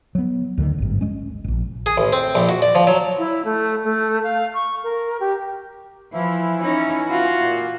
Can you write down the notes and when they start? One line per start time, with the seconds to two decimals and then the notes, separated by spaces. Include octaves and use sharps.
0.15 F#3 B3
0.58 D2 D3 D#3
0.78 G#1 G2
1.01 G#3 C#4
1.44 E1 A#1
1.86 G#4
1.98 A1
2.13 C4
2.35 A#1
2.49 F#4
2.62 D5
2.75 F3
2.87 F#3
3.18 E4
3.45 A3
3.85 A3
4.23 F5
4.54 C#6
4.84 A#4
5.20 G4
6.13 E3 F3 E4
6.62 C#4 D#4
7.08 F4 F#4
7.39 A#2 A#3